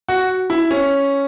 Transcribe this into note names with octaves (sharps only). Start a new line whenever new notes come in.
F#4
E4
C#4